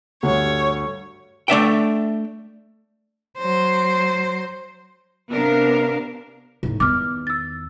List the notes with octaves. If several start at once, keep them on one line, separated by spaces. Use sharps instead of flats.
D2 G2 C#5
A3 D4 E5 G5
F#3 C5
C3 B3 D4 A#4 F5
A2 D#4
E2 D#3 D6 F6
E6 A6